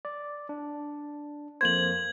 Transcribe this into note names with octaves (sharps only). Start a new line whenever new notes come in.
D5
D4
F2 A#3 C5 G#6 F#7